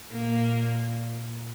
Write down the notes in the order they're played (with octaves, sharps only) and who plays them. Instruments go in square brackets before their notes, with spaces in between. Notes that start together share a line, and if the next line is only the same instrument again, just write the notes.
[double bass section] A#2 [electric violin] A#3